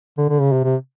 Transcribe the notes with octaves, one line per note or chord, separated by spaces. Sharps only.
D3
D3
C#3
C3
C3